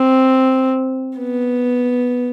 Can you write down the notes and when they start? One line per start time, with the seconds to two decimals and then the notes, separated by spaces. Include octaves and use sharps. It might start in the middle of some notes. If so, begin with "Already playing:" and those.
Already playing: C4
1.18 B3